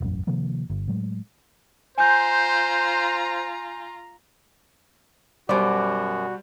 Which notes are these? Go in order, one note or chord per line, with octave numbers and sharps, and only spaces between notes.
E1 A1 F#2
C3 D#3 F3 A#3
G1
A2 F#3 G#3
F4 C5 G#5 A#5 G6
F#2 B2 G3 F#4 C5 D5